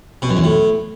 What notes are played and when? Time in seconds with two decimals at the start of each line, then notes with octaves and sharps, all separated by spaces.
0.22 B2
0.30 F#2
0.37 E2
0.44 A2